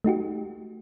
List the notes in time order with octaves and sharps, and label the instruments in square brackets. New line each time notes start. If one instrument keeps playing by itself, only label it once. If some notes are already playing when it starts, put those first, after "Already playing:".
[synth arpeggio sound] A3 D#4 F#4 G4